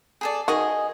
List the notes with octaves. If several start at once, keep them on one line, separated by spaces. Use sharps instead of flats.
G#4 A4 D5
D#3 F#4 G#4 D#5 G#5